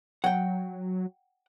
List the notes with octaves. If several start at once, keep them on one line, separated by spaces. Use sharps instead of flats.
F#3 F#5 G5